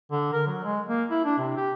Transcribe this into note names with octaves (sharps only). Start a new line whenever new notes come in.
D3
A#4
F#3
G#3
A#3
E4
D4
C3
G4